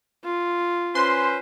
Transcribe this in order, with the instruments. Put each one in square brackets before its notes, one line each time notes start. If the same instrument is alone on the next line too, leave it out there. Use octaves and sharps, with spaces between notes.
[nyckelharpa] F4
[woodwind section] C#4 B4 C5 [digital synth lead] C6